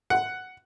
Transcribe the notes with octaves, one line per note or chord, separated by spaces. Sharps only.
F#5